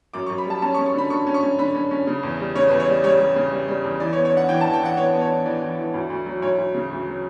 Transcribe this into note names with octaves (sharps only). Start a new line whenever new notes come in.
F#2 D6
F#2 C#6
B5
G3 A5
C#4 A5
C#6
C#4
C#6
D3 B5
D3 C#6
C#4
C#6
C#4
D3 B5
C#4
C#4
C#3
E2
G3
C#3 C#5
E2 B4
C#5
G3 D5
G3 C#5
G3
C#3
G3
G3
E2
E3 D5
C#5
B3
C#5
D4 F#5
E3 G5
E3 A5
G5
E3 F#5
B3 C#5
B3
C#5
D4
E3 D5
E3
E3
D2
D2
F#3
D2 C#5
D2
C#3
D2
F#3